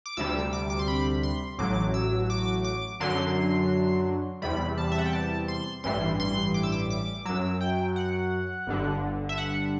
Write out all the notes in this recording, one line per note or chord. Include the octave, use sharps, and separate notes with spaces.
D6
D2 C3 G3 E6
D6
D6
C6
B5
C6
A1 A2 F#3 D6
E6
D6
D6
F#2 D3 F#3 C6
E2 C3 G3 B5
A5
E5
F#5
G5
A5
C6
A1 G2 E3 G3 C6
C6
D6
E6
D6
D6
F#2 F#3 E6
G5
F#5
G1 G2 D3
E5
F#5